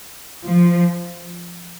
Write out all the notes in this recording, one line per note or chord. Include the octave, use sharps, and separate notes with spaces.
F3